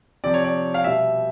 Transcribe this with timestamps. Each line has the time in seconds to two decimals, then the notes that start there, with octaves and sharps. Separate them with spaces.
0.24 C3 F3 D5
0.34 C#5
0.44 D5
0.74 F5
0.84 B2 G3 E5